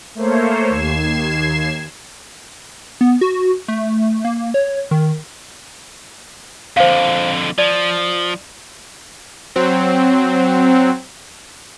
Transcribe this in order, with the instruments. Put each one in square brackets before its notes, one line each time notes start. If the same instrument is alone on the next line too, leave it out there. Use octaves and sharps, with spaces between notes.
[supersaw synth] A3 A#3 C5 C#5
D#2 G#6 C7 E7
[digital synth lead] B3
F#4
A3
A#3
C#5
D#3
[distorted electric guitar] F2 D3 [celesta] C5 F5
[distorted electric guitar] F3 [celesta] D5
[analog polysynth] F#3 C4